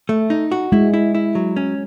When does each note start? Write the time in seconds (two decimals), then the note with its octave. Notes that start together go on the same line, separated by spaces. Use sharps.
0.09 A3
0.30 D#4
0.52 F#4
0.72 G#3 E4
0.94 E4
1.15 E4
1.35 F#3
1.56 C#4